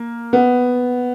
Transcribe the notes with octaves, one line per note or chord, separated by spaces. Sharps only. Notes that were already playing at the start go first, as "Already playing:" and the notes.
Already playing: A#3
B3